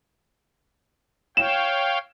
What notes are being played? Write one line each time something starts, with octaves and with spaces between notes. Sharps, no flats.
C#5 F5 G5 E7